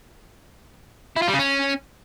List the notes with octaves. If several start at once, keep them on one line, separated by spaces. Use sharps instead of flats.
E4
F4
G3
C#3
C#4